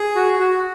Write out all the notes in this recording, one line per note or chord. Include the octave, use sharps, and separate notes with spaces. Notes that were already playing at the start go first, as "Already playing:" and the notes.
Already playing: G#4
F#4
F#4